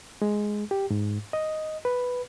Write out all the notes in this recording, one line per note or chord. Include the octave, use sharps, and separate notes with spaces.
G#3
G4
G#2
D#5
B4